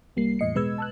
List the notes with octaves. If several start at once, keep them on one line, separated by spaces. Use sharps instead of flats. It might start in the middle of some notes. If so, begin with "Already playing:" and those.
C2 G3 A#3 C7
E2 A2 D#5 C#7
B2 G#3 B4 E6 G#6
A5 E6 F#6